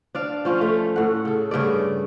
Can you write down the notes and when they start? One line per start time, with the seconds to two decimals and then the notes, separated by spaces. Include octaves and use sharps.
0.15 D4 D5 F5
0.45 F3 C#4 F4
0.61 A3
0.96 A2 F#5
1.25 C#3 A4
1.51 G2 C#3 A3 D5